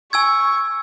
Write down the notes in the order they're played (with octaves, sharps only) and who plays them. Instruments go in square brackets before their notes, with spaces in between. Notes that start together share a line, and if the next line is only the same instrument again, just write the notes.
[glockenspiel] G#5 E6 G#6 [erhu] C#6